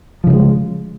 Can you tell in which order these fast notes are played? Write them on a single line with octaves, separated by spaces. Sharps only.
F3 C#3 G3 G#3